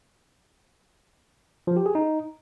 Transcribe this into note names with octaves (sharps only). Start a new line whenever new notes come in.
F3
G4
G#4
D#4